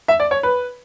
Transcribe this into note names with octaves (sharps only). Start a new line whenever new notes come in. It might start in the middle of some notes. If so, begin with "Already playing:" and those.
E5
D5
C#5
B4